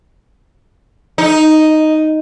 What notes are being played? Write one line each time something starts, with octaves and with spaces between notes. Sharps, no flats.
D#4